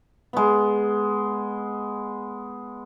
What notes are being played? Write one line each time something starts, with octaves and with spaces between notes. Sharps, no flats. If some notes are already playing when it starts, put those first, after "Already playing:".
G#3 B3